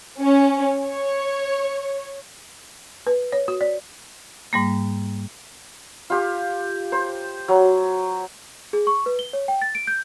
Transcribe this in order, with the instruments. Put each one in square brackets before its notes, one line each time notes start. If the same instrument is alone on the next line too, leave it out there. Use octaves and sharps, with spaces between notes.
[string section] C#4
C#5
[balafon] B4
C#5
F#4
D5
[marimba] G#2 G3 A#3
[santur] F4 G4
C5
F#3
[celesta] G#4
C#6
B4
G7
C#5
G5
A6
D7
G6